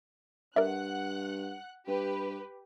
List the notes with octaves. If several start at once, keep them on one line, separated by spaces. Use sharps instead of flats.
G2 A#4 D5 E5 F#5 F#6
G2 G4 B4